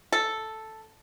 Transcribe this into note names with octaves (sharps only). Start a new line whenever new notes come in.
A4